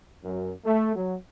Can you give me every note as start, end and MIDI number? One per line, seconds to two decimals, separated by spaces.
0.24 0.53 42
0.65 0.91 57
0.95 1.17 54